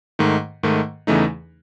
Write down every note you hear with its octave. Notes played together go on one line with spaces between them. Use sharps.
G#2 D#3 A3
G#2 D#3 A3
E2 C#3 E3 A3 D#4